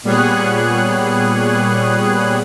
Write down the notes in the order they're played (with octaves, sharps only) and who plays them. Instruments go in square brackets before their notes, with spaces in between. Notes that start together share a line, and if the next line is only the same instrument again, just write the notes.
[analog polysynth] A#2 G3 B3 G#4 C#5 F#6